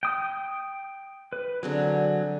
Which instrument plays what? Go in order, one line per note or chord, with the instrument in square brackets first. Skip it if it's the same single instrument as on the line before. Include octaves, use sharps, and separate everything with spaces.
[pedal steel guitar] G5 D#6
B4
[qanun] D3 C4 G#4 [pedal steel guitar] F#3